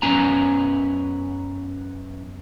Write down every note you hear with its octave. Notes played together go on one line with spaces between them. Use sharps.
F#2 B3 C#4 G#5 A#5